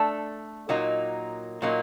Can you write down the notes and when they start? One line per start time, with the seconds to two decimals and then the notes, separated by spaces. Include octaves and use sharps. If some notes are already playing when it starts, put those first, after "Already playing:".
Already playing: A3 D4 A4
0.69 A#2 F#3 A#3 D#4
1.62 A#2 F#3 A#3 D#4